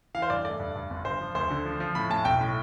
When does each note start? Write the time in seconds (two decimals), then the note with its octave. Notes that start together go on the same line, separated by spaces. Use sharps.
0.15 E3 F5
0.22 C5
0.30 G2 D5
0.45 A3 D5
0.59 G2
0.76 G2
0.90 G1
1.05 G2 C5
1.21 F3
1.35 D2 C5
1.51 D3
1.65 F3
1.80 F3
1.95 A2 B5
2.10 A2 A5
2.25 B1 G5
2.41 A2